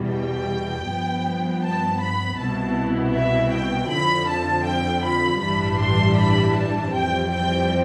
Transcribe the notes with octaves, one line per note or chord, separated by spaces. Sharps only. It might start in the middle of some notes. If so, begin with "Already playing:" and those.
Already playing: E2 B2 G3
G5
G2 F3 B3
A5
B5
C2 B2 B3 E4 A5
E5
G5
F2 D3 F3 B5
A5
G5
B5
A1 G2 E3 G3 D4 B5
C6
B5
A5
F2 E3 G3 C4 G5
G5